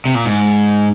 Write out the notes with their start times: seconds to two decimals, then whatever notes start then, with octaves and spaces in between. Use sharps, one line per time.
0.05 C3
0.15 A#2
0.25 G#2